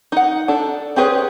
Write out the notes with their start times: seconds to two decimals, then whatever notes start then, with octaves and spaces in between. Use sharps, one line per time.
0.12 D#4 F#5
0.48 D4 A4
0.96 C4 G4 G#4 B4 C#5